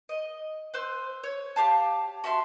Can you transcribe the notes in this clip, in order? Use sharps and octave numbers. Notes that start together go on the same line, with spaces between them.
D#5
B4 C5 E6
C#5
G4 F5 A5
F#4 E5 A5 C6